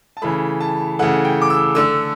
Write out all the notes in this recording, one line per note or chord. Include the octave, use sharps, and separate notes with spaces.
A5
C#3 E3 A3 B5
A5
C#3 E3 A3 F#5
G5
D6
E6
D3 A3 E6